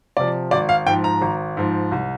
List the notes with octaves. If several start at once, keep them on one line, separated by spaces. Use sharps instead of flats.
C3 F3 D5
G#1 D5
F5
G#2 F3 G5
A#5
G#1
G#2 F3
C2